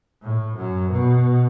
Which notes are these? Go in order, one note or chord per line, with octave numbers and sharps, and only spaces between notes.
A2
F#2
B2